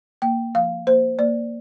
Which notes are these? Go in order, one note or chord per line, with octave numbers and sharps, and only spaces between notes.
A#3 G5
F3 F5
A#3 C5
A#3 D5